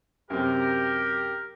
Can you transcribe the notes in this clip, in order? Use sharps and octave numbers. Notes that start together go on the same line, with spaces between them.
F#2 C3 G4 A#4